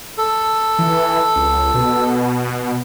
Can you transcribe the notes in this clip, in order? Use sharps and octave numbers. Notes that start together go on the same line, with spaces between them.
A4
E3
C#2
B2